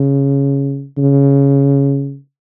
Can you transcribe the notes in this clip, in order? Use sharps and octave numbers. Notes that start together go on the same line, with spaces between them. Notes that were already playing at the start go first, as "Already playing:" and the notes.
Already playing: C#3
C#3